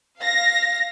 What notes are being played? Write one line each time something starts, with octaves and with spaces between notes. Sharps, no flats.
F5 A#6